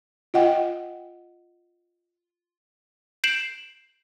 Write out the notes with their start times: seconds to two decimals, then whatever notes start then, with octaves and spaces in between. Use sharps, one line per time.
0.34 F4 D#5 F#5 G5
3.24 G6 C7 D7 E7 F#7